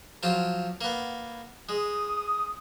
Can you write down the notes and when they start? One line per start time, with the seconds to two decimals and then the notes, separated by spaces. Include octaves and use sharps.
0.23 F3 F#3 F4
0.81 A#3 B3
1.69 G#3 D#6